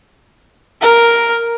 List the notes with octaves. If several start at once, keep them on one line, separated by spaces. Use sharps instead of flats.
A#4